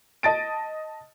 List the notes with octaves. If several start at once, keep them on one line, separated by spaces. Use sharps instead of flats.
D#5 A5 A6 D7